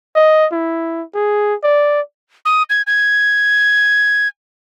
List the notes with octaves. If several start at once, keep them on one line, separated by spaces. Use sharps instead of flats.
D#5
E4
G#4
D5
D#6
G#6
G#6